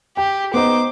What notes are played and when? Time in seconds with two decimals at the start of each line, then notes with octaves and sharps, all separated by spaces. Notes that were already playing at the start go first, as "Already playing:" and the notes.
0.17 G4 G5
0.54 B3 D#4 C5 D6